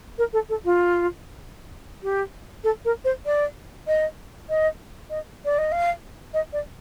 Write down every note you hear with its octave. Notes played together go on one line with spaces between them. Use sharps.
A#4
A4
A4
F4
G4
A4
A#4
C5
D5
D#5
D#5
D#5
D5
D#5
F5
D#5
D5